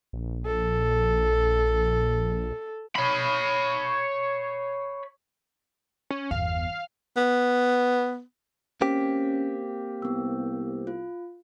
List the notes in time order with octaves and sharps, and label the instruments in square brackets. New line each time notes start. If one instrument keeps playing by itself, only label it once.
[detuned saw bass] A#1
[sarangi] A4
[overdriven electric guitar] C#5 B5
[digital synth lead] C#4
[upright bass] G1 E2 [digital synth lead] F5
[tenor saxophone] B3
[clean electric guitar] A#3 C4 G4 [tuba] C#4 [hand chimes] B6
[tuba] C2 [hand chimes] B3 E6
[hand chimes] F4